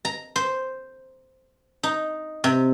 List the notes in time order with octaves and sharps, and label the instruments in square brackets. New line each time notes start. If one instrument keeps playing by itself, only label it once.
[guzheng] A#5
C5
D#4
C3